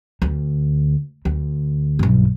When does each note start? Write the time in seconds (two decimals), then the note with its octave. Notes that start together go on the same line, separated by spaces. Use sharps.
0.22 D2
1.25 D2
1.99 B1 G2